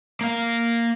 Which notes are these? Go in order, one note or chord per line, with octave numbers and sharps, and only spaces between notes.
A#3 F5